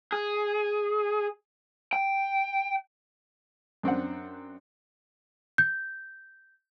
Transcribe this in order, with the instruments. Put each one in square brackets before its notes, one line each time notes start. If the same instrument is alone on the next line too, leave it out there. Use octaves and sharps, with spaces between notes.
[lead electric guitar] G#4
G5
[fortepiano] F#2 C4 D4 F#5
[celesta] G6